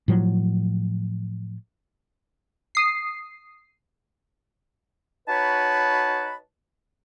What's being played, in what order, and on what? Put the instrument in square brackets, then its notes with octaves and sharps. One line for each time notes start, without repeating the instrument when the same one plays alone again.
[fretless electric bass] A2 F3 F#3
[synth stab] D#6 C7
[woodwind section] D#4 F#4 B4 C#5 A5 B5